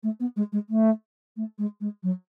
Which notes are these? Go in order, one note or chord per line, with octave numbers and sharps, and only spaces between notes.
A3
B3
G#3
G#3
A3
A3
G#3
G#3
F#3